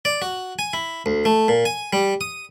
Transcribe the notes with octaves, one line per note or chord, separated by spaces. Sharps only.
D5
F#4
G#5
E4
D2
A3
A#2
G#5
G3
D#6